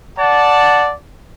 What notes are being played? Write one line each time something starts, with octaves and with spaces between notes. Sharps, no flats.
D5 F#5 A5